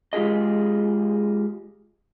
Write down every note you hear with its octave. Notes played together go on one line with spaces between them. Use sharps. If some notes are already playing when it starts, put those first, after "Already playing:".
G#3 F4 G4 G#4 D#5